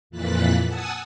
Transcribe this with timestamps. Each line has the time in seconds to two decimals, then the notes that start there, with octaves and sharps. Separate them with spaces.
0.10 F2 A#2 E3 F#6 A6 B6
0.65 F#5 G#5 A5 D#6 E6